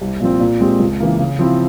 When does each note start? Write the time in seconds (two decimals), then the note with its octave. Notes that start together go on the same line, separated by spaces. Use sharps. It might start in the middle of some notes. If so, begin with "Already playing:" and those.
0.01 C2
0.20 A#2 F3 C4
0.40 A#2
0.60 G#3 C4 G4
0.80 C#2
1.00 C#3 E3 A#3
1.19 C#3
1.39 F3 C4 E4